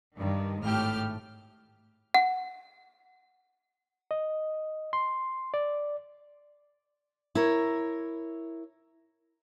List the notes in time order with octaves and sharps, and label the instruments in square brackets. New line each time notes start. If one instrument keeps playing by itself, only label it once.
[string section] G2 D#3
G#1 A2 A3 G4 F6
[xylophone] F#5
[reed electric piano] D#5
C6
D5
[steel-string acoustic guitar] E4 A#4 C#5